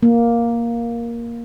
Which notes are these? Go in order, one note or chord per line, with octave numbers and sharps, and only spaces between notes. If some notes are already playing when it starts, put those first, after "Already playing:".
A#3